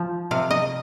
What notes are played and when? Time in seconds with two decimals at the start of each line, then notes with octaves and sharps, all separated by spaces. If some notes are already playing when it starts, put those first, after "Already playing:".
Already playing: F3
0.31 C3 F5
0.51 D#5